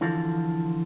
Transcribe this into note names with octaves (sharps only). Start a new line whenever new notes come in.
D3 E3 F3 F4 A4